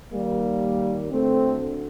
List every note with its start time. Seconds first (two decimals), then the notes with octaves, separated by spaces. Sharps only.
0.13 D#2 D#3 G3 A#3
1.11 D2 D3 A3 C4